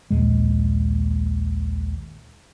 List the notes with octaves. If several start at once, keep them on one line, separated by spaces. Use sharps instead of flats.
A#1 D#2 A#2 G#3